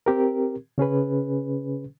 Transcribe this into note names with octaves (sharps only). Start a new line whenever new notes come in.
C4 G4 A#4
C#3 C#4 G#4 B4